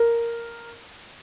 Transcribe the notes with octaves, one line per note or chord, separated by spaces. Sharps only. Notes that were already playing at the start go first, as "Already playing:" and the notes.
Already playing: A#4